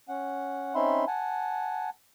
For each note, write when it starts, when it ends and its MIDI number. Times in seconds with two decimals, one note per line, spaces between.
0.09 0.75 61
0.09 0.75 78
0.75 1.05 60
0.75 1.05 61
0.75 1.05 63
0.75 1.05 76
0.75 1.05 83
0.75 1.05 84
1.08 1.90 78
1.08 1.90 80
1.08 1.90 81